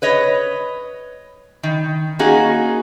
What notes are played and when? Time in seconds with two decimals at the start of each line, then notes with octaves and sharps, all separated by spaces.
0.02 B4 C#5 D#5
1.63 D#3
2.19 A#3 C#4 D#4 F#4 G#4